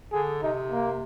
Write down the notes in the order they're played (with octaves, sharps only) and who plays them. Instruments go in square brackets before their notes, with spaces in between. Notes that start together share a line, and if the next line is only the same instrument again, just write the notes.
[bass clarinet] D3 [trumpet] G#4
[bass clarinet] C3 [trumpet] D#4
[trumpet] A#3